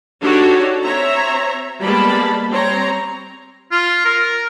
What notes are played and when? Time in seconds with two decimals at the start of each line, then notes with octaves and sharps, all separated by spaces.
0.22 D4 D#4 F#4 G4 A4 C#5
0.85 C4 C#5 E5 A#5
1.83 G3 G#3 A#3 B3 A5 B5
2.49 G3 C4 C#5 A#5
3.72 F4
4.05 A#4